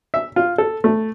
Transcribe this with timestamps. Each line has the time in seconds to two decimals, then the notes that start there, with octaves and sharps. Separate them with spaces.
0.14 E5
0.36 F4
0.58 A4
0.84 A3